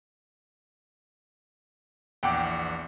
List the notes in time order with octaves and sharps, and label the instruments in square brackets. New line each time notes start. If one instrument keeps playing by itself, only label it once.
[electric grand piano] A#1 E2 F#5 [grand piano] G5 D6